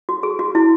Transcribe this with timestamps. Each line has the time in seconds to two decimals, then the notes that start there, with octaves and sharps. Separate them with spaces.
0.09 F#4
0.23 G#4
0.39 F#4
0.55 E4